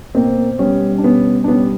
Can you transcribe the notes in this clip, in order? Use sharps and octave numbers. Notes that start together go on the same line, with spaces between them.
B2 A#3 C4
G3 B3 C#4
D4
B2 B3 C#4
D4
G3 B3 C#4